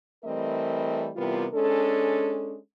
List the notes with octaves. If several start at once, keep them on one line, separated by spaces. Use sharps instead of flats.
E3 G3 A3 C4 A#4 D#5
C3 E3 G3 B3 F4 A#4
G#3 C#4 D4 A4